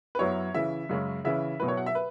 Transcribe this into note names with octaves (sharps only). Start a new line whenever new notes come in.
B4
F#2 F#3 B3 E4 C#5
C#3 E3 C#4 E4 E5
F#2 C#3 G#3 C#4
C#3 E3 C#4 E4 E5
B2 F#3 E4 B4
C#5
F#5
E5
B4